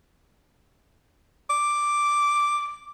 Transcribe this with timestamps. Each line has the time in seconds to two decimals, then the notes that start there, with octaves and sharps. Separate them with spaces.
1.50 D6